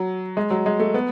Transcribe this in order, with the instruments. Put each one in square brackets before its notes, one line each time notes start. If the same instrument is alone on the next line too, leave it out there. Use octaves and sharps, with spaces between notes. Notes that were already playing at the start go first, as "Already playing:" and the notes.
Already playing: [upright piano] F#3
G#3
F#3
G#3
A3
B3